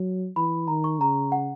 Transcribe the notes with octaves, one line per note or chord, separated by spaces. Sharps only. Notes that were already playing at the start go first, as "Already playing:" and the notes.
Already playing: F#3
E3 B5
D#3 A#5
C#6
C#3 A#5
F#5